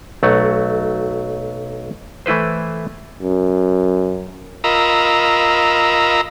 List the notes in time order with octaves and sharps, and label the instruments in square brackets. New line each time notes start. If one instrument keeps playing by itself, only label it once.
[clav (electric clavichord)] B1 F#3 A3 F#5
E3 A3 E4 B4 C5
[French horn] F#2
[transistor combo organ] F4 A#4 D#5 A#5 B5 E6